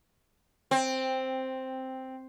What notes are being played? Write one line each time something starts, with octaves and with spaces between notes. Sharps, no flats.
C4